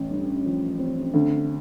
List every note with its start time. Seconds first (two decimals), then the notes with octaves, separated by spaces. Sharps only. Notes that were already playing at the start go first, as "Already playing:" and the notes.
Already playing: A1
0.10 G2
0.46 F3
0.79 C4
1.14 D2